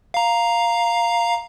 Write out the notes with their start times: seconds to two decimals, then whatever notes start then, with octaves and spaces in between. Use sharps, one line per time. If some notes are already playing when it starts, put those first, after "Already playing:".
0.14 F5 A#5